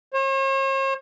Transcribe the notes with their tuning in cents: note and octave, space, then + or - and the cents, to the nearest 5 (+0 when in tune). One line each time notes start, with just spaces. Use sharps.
C#5 -45